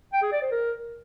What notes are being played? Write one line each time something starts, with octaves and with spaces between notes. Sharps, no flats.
G5
G#4
D5
C5
A#4